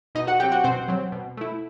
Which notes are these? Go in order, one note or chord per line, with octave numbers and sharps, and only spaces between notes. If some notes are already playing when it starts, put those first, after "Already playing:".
B2 D#4 D#5
F#4 F#5
F#3 C4 G4 G5
F#4 F#5
B2 C4 C5
F#3 C4
B2
A3 E4